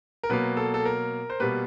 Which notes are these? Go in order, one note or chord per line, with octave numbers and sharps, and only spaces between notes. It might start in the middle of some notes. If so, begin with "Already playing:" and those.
A#4
B2 F#3 A#3 B4
A4
A4
A#4
C5
B2 G3 A#3 B4